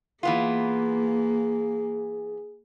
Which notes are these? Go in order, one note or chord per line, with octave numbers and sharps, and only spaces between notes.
E3 A#3 B3 F4 G#4